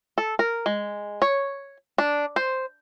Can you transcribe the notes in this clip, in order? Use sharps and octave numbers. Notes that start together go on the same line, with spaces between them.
A4
A#4
G#3
C#5
D4
C5